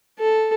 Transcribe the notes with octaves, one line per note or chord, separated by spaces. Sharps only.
A4